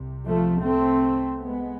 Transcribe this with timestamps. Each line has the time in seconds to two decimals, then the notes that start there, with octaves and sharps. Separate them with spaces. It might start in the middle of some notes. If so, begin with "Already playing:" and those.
Already playing: C2 C3
0.27 F3 A3
0.65 A3 C4
1.40 G#3 B3